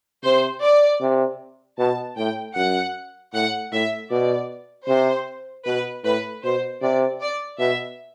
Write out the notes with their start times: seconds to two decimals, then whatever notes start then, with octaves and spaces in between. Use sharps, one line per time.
0.24 C3 C5
0.62 D5
1.01 C3
1.79 B2 A5
2.17 A2 G5
2.56 F#2 F#5
3.34 A2 F#5
3.72 A2 E5
4.11 B2 D5
4.88 C3 C5
5.66 B2 B4
6.04 A2 B4
6.44 B2 C5
6.82 C3 D5
7.20 D5
7.59 B2 E5